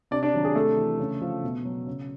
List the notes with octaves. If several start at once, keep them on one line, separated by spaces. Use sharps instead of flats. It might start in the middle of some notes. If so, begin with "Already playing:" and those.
C3 D4 D5
D4 D5
D#3 F#3
G#4
C3 A3 A4
E3
C#3
F3
B2
F#3
C#3